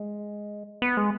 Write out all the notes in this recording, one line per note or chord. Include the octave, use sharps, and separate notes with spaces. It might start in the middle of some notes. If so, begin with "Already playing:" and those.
Already playing: G#3
B3
G#3